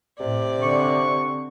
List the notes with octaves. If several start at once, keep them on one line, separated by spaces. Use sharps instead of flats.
A2 C3 D5
D3 C4 C#6